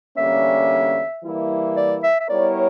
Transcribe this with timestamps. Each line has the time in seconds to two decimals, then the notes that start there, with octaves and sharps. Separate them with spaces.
0.17 E2 D3 G3 A#3 C#4 E5
1.23 E3 G3 A#3 E4
1.76 D5
2.03 E5
2.20 E5
2.29 G3 B3 E4 A#4 C#5 D5